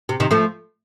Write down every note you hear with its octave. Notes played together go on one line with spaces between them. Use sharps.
C3
C3 D#3
F3 A3